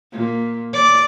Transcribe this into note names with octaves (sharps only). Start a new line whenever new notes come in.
A#2
D5